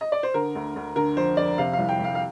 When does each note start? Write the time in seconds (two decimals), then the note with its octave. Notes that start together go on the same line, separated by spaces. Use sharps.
0.01 D#5
0.12 D5
0.23 C5
0.34 D3 A#4
0.55 D2
0.76 D2
0.96 D3 A#4
1.17 F2 C5
1.37 F2 D5
1.58 C3 F5
1.73 F5
1.78 C2
1.89 G5
1.99 C2
2.04 F5
2.15 F5